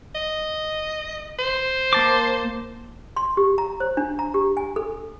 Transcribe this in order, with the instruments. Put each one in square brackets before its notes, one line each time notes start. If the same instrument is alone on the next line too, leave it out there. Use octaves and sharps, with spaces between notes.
[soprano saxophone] D#5
C5
[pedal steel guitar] A#3 A5 D6
[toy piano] C6
G4
A#5
C5
D4
A#5
G4
G#5
A4